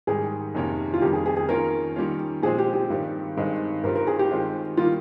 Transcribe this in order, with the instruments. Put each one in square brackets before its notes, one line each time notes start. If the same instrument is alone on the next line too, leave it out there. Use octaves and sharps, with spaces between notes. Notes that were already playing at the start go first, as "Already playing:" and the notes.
[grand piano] G#2 D#3 G3 [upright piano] G#4
[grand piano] F2 C3 D#3 A#3 C#4
[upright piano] F4
[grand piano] F2 D#3 G3 [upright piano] G4
[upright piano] G#4
G#4
G#4
[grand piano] D#3 A#3 C#4 F4 [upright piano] A#4
[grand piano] D#3 G3 A#3 C#4 F4
[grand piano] A#2 F3 G#3 C4 [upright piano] G#4
[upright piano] G4
G4
[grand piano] G2 D#3 G3 C4
G2 D#3 G#3 C4 D#4
[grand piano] G2 G3 C4 F4 [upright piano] A#4
[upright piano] A#4
G#4
G4
[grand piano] D#3 G#3 C4 F4
[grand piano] D#3 G3 A#3 [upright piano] F4